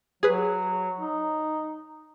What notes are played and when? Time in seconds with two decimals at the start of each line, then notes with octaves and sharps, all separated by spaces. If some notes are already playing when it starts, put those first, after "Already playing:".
0.23 F#3 G#4 B4
1.00 D#4